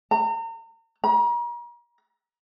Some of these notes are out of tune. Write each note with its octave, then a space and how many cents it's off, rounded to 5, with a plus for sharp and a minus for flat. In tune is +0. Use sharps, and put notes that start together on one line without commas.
A#5 -40
A#5 +40